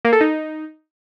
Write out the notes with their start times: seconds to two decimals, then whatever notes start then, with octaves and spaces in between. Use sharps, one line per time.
0.05 A#3
0.13 A4
0.21 D#4